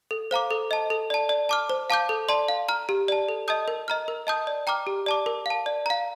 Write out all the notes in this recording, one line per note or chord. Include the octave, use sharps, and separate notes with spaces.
A4
C5 F5 A#5 D6
A4
D#5 A5
A4
D5 A5
D5
A5 D6 F6
C5
F5 A5 D6 G6
A4
D5 A5 C6
F5
A#5 F6
G4
D5 A5
A4
D#5 A5 D#6 G6
A#4
D#5 A#5 F6
A#4
D#5 A5 D#6 G6
D5
G5 A#5 D6 F6
G4
D5 A5 D6
A#4
F5 A5
D5
F5 A#5